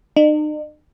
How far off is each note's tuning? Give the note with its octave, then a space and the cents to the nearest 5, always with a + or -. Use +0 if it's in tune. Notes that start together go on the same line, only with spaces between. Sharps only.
D#4 -45